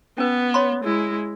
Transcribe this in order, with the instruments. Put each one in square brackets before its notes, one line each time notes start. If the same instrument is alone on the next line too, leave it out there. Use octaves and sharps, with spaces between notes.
[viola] B3 [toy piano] C#4 B4
[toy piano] C#5 B5 C6
[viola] G#3 E4